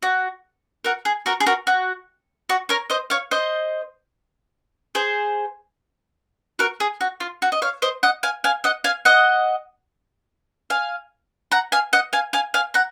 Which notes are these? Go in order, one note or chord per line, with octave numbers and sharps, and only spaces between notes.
F#4
F#4 A#4
G#4
F#4 A#4
G#4
F#4 A#4
F#4
F#4
A#4 C#5
C5 D#5
C#5 F5
C5 D#5
G#4 C5
F#4 A#4
G#4
F#4
F4
F#4
D#5
C#5 F5
C5 D#5
D#5 F#5
F5 G#5
F5 G#5
D#5 F#5
F5 G#5
D#5 F#5
F5 G#5
F#5 A#5
F5 G#5
D#5 F#5
F5 G#5
F5 G#5
F5 G#5
F#5 A#5